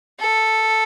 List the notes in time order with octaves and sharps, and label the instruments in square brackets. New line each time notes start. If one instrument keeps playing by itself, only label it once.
[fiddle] A4